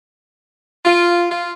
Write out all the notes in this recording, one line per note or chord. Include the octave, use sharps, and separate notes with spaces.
F4
F4